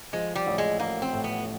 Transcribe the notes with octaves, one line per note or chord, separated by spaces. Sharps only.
F3 G#3
G3
A1
G#3
A1 A#3
C4
A2
B3